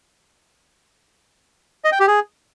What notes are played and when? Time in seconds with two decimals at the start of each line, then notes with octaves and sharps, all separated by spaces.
1.84 D#5
1.92 G5
2.00 G4
2.08 G#4